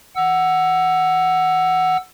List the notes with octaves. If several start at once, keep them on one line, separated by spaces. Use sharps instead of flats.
F#5 E6